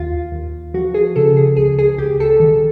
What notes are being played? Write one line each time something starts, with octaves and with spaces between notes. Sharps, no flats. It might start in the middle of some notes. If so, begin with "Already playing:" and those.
Already playing: D#2 F4
D#2
F3 F#4
G#4
C#3 A4
G#4
C#2 G#4
G#4
C#2 G4
A4
D#3